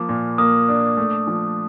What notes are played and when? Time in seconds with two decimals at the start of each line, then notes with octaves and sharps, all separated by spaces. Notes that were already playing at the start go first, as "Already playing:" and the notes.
Already playing: F3 A#3 D6
0.09 A#2
0.38 A#3 D#6
0.68 D4
0.97 A3
1.27 F3